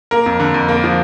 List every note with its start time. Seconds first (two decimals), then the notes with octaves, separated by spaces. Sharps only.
0.11 A#3 A#4
0.26 F2
0.40 D3
0.54 F2
0.68 A#3
0.84 F3